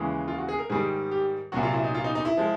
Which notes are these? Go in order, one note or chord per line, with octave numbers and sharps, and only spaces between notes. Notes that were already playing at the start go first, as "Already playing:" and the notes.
Already playing: D#2 C#3 E3 G#3
F4
F#4
G#4
A#4
G#2 D#3 G3 G#4
G4
C2 A#2 F#3 F#4
F4
E4
D#4
F4
D#4
D#4
E4
F3 G#3